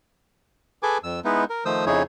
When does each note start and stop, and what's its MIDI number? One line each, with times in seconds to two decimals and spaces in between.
0.83 0.98 68
0.83 0.98 69
0.83 0.98 71
0.83 0.98 80
0.83 0.98 86
1.03 1.20 41
1.03 1.20 88
1.25 1.44 56
1.25 1.44 59
1.25 1.44 63
1.25 1.44 64
1.50 1.64 70
1.65 1.85 51
1.65 1.85 53
1.65 1.85 57
1.65 1.85 72
1.65 1.85 87
1.65 1.85 88
1.86 2.03 41
1.86 2.03 49
1.86 2.03 63
1.86 2.03 64
1.86 2.03 68
1.86 2.03 73